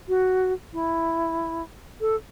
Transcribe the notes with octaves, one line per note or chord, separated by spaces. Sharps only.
F#4
E4
A4